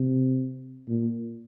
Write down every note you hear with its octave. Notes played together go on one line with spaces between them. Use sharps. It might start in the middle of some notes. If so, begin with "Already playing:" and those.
Already playing: C3
A#2